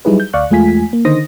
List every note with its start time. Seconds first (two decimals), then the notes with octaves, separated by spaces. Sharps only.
0.05 F#3 G3 D#4 E4 G#4 B4
0.20 G6
0.33 D2 D5 F5 C#6 F#6
0.51 E2 G#3 A3 F4 G#5 B6
0.93 A#3
1.05 D3 D#3 D#4 C5 D#6 A#6